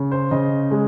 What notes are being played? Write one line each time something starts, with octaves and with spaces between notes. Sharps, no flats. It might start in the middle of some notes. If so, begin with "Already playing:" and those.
Already playing: C#3
C5
C#3 D#5
G#3